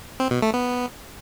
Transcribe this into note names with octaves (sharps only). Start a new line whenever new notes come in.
C4
B2
A3
B3